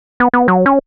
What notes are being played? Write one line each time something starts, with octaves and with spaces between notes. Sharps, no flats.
B3
B3
F#3
C#4